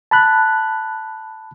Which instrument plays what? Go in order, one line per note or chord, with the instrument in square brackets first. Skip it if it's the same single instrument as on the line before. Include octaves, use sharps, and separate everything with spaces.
[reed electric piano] A5 B5 F#6